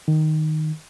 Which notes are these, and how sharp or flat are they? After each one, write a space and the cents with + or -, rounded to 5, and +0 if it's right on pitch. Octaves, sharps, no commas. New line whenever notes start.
D#3 +0